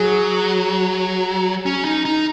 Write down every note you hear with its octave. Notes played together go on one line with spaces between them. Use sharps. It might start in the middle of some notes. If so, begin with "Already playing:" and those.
Already playing: F#3 G#4
C#4
D#4
D#4